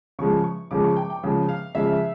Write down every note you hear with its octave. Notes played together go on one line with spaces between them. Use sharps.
C#3 F3 G#3 C#6
C#6
C#3 F3 G#3 D6
C#6
G5
G5
C#3 F3 G#3
F5
C#3 F3 G#3 E5